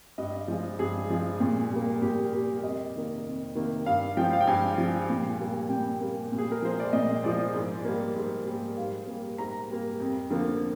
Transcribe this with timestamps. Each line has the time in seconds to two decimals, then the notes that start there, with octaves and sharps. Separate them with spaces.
0.18 G2 D#5
0.48 F3 G#3
0.79 G2 G#4
1.10 F3 G#3
1.40 A#2
1.72 G3 A#3
2.02 A#2 G4
2.33 G3 A#3 G4
2.63 F2 D#5
2.94 C3 D#3 A#3
3.25 F2
3.55 C3 D#3 A#3
3.86 G2 F5
4.17 F3 G#3 G5
4.33 F5
4.41 G5
4.47 G2 G#5
4.78 F3 G#3
5.09 A#2
5.40 G3 A#3
5.70 A#2 G5
6.01 G3 A#3
6.32 A#2
6.38 G#4
6.52 A#4
6.62 F3 G#3 C5
6.80 D5
6.93 A#2 D#5
7.24 F3 G#3 D5
7.54 G#2
7.85 G3 A#3
8.16 G#2
8.46 G3 A#3
8.77 G#2 F5
9.07 G3 A#3
9.38 G#2 A#5
9.70 G3 A#3
10.00 F2
10.30 D3 F3 A#3